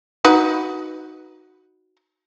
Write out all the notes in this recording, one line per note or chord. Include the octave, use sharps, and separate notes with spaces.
D#4 F#4 B4